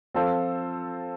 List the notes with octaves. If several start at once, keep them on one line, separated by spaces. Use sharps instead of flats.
F3 C4 F4 A4 C5